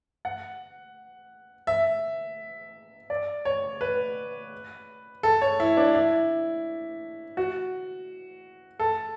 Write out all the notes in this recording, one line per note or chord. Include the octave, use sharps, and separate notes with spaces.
F#5
E5
D5
C#5
B4
A4
C#5
E4
D4
E4
F#4
A4